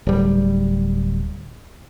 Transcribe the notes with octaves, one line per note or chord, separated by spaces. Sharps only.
D1 G3